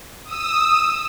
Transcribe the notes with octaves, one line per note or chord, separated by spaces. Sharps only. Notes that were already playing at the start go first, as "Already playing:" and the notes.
D#6 E6